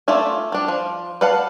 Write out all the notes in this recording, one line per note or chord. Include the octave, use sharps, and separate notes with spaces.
A3 F4 D5 E5 G#5
G3 D4
F3
B4 D5 F5 F#5 A5